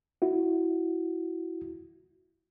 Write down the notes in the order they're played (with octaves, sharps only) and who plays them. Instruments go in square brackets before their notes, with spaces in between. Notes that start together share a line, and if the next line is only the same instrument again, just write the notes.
[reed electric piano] E4 F#4